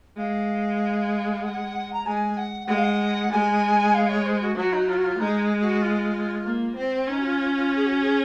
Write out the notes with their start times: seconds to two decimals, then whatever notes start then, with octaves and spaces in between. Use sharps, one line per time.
0.17 G#3 F5
1.43 F#5
1.92 A#5
2.05 G#3 G#5
2.37 F#5
2.67 G#3 F#5
2.76 F5
2.83 F#5
3.31 G#3 G#5
3.94 F5
4.09 C#5
4.25 C5
4.41 F#4
4.56 F#3 F#4
4.72 D#4
4.88 F4
4.97 F#4
5.04 F4
5.19 G#3 D#4
5.61 F#4
5.82 F4
6.44 A#3
6.76 C4
7.07 C#4 D#4
7.18 F#4
7.24 F4
7.39 F4
7.54 F4
7.75 G#4
7.86 F#4
8.02 G#4